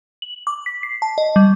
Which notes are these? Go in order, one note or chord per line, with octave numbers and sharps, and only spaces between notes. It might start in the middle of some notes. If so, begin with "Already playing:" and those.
F#7
D6
B6
C7
A5
D#5
G3